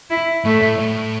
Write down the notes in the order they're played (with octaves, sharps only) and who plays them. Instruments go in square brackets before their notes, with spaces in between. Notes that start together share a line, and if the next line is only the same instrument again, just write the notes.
[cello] E4
[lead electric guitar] A2 [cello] A3
[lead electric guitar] A2
A2